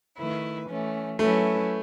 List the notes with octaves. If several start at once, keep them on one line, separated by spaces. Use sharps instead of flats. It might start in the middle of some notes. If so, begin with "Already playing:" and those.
D#3 A3 E4 B4
E3 A3 C#4
F#3 A3 C#4 E4 B4